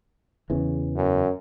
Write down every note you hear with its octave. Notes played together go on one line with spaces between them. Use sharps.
E2 C#3 E3
F#2